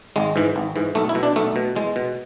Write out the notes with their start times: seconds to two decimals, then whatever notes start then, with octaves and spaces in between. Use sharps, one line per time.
0.16 G#1 G#3
0.36 G#2 E3
0.56 G#1
0.76 G#2 E3
0.95 B1 A3
1.09 E4
1.15 B2
1.23 D4
1.36 B1 A3
1.56 B2
1.76 E2 G#3
1.96 B2